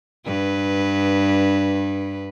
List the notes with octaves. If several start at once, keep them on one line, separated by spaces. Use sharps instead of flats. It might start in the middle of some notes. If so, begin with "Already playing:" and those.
G2 B4